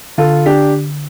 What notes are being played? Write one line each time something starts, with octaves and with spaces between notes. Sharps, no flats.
D3 F4 A4
D4 G4